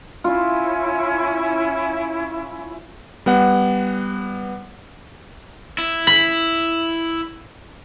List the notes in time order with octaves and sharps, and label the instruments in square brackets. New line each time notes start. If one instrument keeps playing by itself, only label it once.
[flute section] C#4 E4 [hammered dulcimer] F4
[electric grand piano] G3 B3 F#5
[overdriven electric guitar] E4
[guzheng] B5